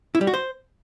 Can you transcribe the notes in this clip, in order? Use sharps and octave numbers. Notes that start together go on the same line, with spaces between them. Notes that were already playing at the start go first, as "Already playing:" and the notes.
E4
G3
F#4
C5